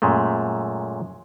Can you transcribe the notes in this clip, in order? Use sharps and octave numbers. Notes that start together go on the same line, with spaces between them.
F#2 A#2 G#3 A3